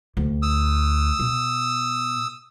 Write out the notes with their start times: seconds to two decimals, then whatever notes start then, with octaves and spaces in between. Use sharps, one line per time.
0.17 D2
0.42 D#6 E6
1.19 B2